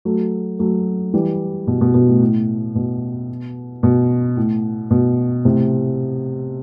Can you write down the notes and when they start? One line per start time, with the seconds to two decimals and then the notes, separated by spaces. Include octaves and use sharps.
0.05 F#3 A3
0.59 F#3 A3
1.14 E3 G3
1.67 B2
1.81 B2
1.94 B2
2.08 A2
2.21 A2
2.75 B2
3.83 B2
4.37 A2
4.91 B2
5.45 A2 C3